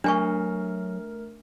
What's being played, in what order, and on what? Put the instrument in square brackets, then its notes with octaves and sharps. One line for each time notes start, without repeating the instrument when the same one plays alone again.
[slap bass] F#3 [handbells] A3 A#4 F6 [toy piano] D4 G#5 C#6